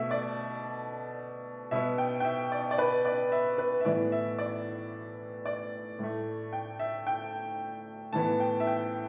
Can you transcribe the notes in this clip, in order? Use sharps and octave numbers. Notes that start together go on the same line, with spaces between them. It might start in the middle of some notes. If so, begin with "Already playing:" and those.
Already playing: B2 A3 E5
D5
B2 B3 E5
G5
G5
E5
D5
D5
B4
D5
E5
B4
E5
A2 E3 B3 D5
E5
D5
D5
A2 A3
G5
E5
G5
A2 E3 B3 A5
G5
E5
G5